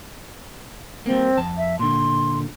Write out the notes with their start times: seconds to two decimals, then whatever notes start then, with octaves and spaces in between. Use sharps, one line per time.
1.06 G3 A#3 C4
1.37 F2 A5
1.58 E5
1.79 A#2 D3 C6